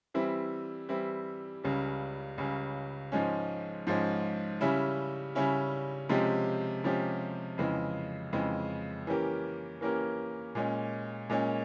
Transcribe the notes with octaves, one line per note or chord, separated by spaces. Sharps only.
E3 G3 C4 E4
E3 G3 C4 E4
C#2 C#3 G3 C#4
C#2 C#3 G3 C#4
G#2 F3 G#3 C#4
G#2 F3 G#3 C#4
C#3 G3 C#4 E4
C#3 G3 C#4 E4
C3 F3 G#3 C#4 G4
C3 F3 G#3 C#4 G4
F2 C#3 E3 G#3
F2 C#3 E3 G#3
E3 A#3 C#4 G4 A#4
E3 A#3 C#4 G4 A#4
A#2 G#3 C#4
A#2 G#3 C#4